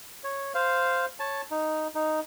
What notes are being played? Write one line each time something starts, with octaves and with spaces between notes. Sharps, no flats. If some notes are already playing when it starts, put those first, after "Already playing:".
C#5
C5 F5
C#5 A5
D#4
D#4